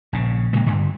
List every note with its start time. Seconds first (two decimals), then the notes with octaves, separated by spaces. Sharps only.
0.13 A#1 C#3
0.53 A2 C#3 G#3 A#3
0.66 G2 D3